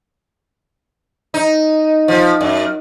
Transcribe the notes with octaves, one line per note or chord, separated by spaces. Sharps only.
D#4
F3
F#2